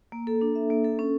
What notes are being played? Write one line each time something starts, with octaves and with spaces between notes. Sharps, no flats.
A#3
A4
D4
E5
A#3
A4
C#4